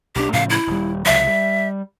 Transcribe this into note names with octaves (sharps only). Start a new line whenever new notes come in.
B1 F#3 D4 G4
A2 C#3 F3 F5
E4
D#1 G3
C#2 C3 F#3 E5
G3